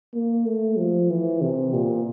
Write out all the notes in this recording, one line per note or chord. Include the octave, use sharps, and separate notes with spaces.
A#3
A3
F3
E3
C3
A#2